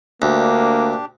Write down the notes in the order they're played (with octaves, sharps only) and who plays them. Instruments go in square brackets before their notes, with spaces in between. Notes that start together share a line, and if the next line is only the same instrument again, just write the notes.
[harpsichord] D2 [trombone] A#3 [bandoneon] D4 G4